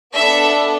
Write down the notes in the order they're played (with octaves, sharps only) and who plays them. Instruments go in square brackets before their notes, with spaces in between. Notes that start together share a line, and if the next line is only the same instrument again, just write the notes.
[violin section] B3 D4 A4 E5